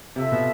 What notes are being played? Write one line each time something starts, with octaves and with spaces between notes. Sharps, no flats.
C3 F4 A4 E5
B2